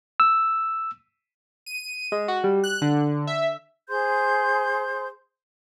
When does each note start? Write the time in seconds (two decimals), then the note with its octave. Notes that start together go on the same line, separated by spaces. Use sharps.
0.20 E6
1.66 D#7
2.12 G#3
2.28 F#4
2.44 G3
2.64 F#6
2.81 D3
3.27 E5
3.88 G#4 C5 C6 G6